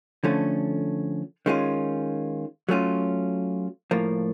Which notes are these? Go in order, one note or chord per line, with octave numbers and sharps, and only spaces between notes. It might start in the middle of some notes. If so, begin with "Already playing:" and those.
D3 F3 A3 C#4
D#3 G#3 C#4 F4
F#3 A3 C#4 F4
A2 F3 A#3